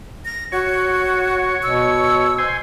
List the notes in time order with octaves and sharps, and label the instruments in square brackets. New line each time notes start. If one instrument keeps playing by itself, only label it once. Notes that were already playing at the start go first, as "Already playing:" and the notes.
[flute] A#6
[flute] F#4 [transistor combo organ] C#5
[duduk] B2 [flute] E6
[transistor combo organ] C5 G#5